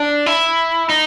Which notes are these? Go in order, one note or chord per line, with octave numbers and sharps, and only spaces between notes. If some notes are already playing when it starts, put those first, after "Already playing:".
Already playing: D4
E4
D#4